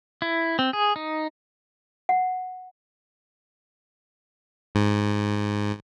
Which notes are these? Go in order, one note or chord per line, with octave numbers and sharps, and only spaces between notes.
E4
C4
G#4
D#4
F#5
G#2